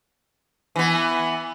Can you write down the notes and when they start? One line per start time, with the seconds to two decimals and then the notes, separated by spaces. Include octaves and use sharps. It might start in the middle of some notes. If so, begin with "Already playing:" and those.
0.76 E3 B3